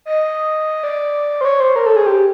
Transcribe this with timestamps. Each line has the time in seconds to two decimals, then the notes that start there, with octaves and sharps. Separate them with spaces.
0.05 D#5
0.83 D5
1.41 C5
1.45 C#5
1.60 C5
1.76 A#4
1.86 A4
1.96 G#4
2.06 G4